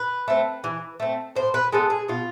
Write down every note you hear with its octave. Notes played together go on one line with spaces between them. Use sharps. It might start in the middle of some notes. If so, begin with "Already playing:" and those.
Already playing: B4
A3 C4
E3
A3 C4
A2 C5
B4
G#3 B3 A4
G#4
B2 F4